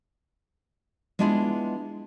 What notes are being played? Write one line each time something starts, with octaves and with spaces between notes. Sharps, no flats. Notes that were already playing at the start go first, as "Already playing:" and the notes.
G#3 B3 D4 E4 F4 G#4